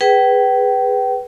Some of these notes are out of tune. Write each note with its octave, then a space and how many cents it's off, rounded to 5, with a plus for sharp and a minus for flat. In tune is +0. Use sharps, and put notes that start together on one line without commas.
G#4 -10 B4 +0 G5 -30